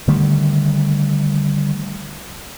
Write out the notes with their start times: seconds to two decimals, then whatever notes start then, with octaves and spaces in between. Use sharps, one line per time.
0.08 D3 D#3 G3 A3